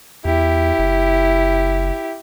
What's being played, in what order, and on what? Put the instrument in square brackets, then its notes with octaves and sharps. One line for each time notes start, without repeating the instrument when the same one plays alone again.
[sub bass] E2 [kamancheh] E4 G4
[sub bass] F#1